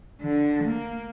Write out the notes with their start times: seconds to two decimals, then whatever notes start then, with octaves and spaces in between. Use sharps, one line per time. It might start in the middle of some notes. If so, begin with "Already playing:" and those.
0.21 D3
0.64 A#3